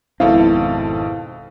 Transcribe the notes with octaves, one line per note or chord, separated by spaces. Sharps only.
G#1 F2 G#2 B2 C4 E4 A4 F5